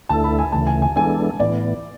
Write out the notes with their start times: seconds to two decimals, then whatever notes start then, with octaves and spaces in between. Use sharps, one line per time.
0.09 D2 D3 A3 E4 A4 A5
0.24 B5
0.39 G#5
0.52 D2 C#3 E3 A3 A5
0.67 G#5
0.82 G#5
0.96 E3 G#3 B3 D4 A4 G#5
1.39 A2 E3 B3 D5